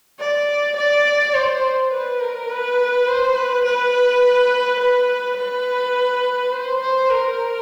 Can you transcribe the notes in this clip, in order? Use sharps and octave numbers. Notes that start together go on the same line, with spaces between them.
D5
D5
C5
B4
A#4
B4
C5
B4
B4
B4
B4
C5
C5
A#4